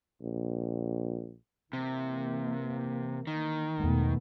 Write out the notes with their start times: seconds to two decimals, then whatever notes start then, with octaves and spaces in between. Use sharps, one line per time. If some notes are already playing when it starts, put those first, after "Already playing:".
0.22 A#1
1.73 C3 E3 A#3
3.27 D#3
3.80 E2 B2 G#3 A3 B3